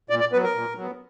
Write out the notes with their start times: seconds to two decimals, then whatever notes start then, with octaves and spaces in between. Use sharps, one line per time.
0.10 A#2 D5
0.20 D5
0.32 B3 B4
0.35 F#3
0.43 A#4
0.55 A#2
0.76 F#3 B3